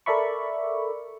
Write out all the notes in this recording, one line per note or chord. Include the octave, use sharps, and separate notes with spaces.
A4 A#4 D5 E5 B5 C#6